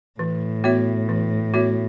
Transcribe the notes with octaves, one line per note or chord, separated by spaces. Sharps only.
A2 E3
B3 F#4 C#5 E5
E3
B3 F#4 C#5 E5